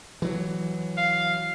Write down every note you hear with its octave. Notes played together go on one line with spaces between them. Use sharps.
E3 F#3
F5